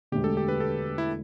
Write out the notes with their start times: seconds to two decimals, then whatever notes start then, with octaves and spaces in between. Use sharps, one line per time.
0.12 E1 D2 D3 G4
0.24 A4
0.37 G4
0.48 B4
0.60 A4
0.98 E4